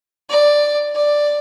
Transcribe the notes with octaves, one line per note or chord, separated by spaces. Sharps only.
D5
D5